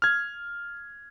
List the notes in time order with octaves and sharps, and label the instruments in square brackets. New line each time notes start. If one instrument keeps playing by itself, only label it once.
[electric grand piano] F6 G#6